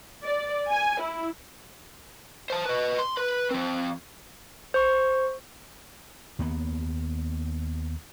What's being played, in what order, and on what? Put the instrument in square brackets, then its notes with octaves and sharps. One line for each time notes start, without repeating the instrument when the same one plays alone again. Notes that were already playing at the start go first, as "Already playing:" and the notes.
[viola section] D5
G#5
E4
[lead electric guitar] C5 A5
B4 D#5
C6
B4
F3 C4
[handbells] C5 C#6
[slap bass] D#2 A#3 B3